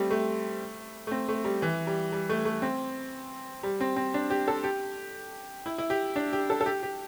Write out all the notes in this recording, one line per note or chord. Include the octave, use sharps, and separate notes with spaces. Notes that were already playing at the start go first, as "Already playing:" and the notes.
Already playing: G3 A3 C4
A3
A3
C4
A3
G3
E3
G3
G3
A3
A3
C4
G3
C4
C4
D4
G4
A4
G4
E4
E4
G4
D4
G4
A4
A4
G4
G4